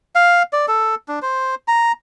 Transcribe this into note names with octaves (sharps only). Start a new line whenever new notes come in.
F5
D5
A4
D4
C5
A#5